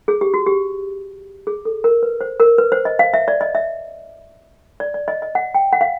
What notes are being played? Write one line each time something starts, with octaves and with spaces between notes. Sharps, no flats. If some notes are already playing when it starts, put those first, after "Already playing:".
G#4
G4
F#4
G4
G#4
A4
A#4
B4
C5
A#4
B4
C5
D#5
F5
E5
D5
D#5
E5
D5
D5
D#5
D#5
F#5
G5
F#5
F5